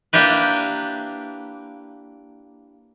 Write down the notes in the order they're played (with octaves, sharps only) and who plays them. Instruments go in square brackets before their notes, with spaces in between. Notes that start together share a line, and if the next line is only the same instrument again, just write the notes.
[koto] A#3 D4 E4 G4 B4